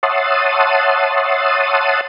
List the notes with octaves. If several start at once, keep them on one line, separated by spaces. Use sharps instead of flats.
C#5 E5 F#5 A5 C6 D#6